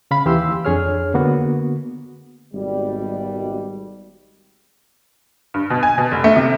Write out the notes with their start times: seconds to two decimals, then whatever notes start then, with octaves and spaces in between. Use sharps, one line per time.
0.11 C#3 F5 B5
0.25 D#2 E3 G4 F5 C6 E6
0.65 F2 D4 G#4 C#5 F6
1.14 D3 A#3 B3 F#4
2.54 G#1 B2 G3
5.54 G2
5.70 B2
5.83 G#5
5.98 B2
6.11 F1
6.24 A3
6.36 C3